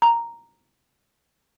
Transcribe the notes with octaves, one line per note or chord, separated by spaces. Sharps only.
A#5